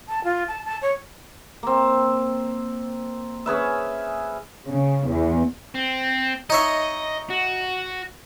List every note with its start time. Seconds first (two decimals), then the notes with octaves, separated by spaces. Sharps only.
0.09 A5
0.24 F4
0.48 A5
0.65 A5
0.82 C#5
1.63 A#3 C4
3.46 C#4 G#4 B4 E5
4.69 C#3
5.09 E2
5.75 C4
6.50 D#4 C#5 D#5 E5
7.30 F#4